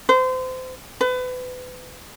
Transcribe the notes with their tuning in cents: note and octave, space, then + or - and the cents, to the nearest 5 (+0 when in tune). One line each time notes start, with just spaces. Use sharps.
C5 -30
B4 +30